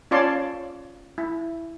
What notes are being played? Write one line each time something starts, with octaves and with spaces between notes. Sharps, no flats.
C#4 F4 C#5 D5 A5 C6
E4